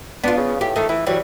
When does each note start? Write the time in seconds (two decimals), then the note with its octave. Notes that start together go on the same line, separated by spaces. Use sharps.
0.24 B3 D4 F4
0.37 C#3
0.61 A2 G4
0.76 D#3 A3 D#4
0.89 E3 E4
1.07 E3 F#3 G3